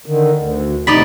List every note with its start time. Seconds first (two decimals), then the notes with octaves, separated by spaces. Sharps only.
0.06 D3 D#3
0.38 D2
0.87 D#2 A2 C3 D#4 D5 B5